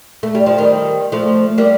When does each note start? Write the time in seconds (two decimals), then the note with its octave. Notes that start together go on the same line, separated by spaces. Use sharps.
0.23 A3
0.35 G3
0.46 F3
0.58 D#3 G3
1.12 F3 A3
1.58 G3 A#3